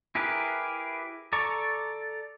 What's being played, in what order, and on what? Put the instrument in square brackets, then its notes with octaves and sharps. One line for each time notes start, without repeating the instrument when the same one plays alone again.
[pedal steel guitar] E4 G4 G#4 A#4 B4
A4 D5 A#5 C#6